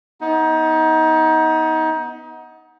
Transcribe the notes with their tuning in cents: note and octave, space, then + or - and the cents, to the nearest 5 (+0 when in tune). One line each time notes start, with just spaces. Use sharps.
B3 -5 D#4 +25